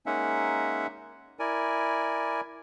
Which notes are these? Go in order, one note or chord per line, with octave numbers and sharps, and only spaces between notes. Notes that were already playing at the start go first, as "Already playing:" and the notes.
G#3 A#3 C#4 D#4 E5 F#5
E4 A#4 D5 G#5